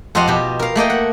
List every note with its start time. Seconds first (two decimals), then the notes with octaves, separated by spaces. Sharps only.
0.15 F2 F4 G4 C5 D#5 F#5
0.28 B2 G4
0.59 A#4 F5
0.75 A3 A#3 D#5 G5
0.90 F#5